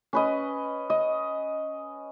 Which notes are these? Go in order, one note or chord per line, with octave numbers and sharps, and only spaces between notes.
C#4 B4 D#5
D#5